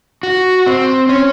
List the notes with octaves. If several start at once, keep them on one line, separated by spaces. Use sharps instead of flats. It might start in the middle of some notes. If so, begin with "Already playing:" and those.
F#4
C4
C#4